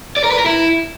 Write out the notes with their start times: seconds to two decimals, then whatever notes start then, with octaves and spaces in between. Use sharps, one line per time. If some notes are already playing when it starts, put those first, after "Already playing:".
0.17 D5
0.24 A#4
0.31 B4
0.39 A#4
0.46 E4